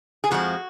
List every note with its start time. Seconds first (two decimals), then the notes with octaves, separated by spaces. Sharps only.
0.24 G#4
0.31 F2 F3 G#3 F#4